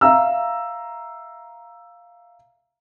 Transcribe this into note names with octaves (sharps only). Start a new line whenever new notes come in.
E5 F5 A#5 E6